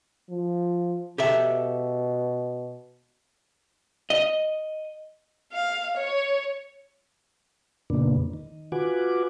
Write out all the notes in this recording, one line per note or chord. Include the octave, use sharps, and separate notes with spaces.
F3
B2 G4 A4 E5
D#5
F5
C#5
F2 A#2 C#3 A#3 B3 D4
D#3
F4 F#4 B4 F#5 G#5 D6